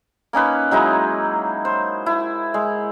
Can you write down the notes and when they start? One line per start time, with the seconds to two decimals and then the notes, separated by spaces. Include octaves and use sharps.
0.33 A#3 C#4 D#4 B4
0.71 F#3 G#3 D#4 E4
1.65 C5
2.06 E4
2.54 G#3